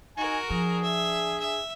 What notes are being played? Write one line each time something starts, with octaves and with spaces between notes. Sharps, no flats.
D#4 F#4 A#4 G#5
F3 D4 G#4
E5
E5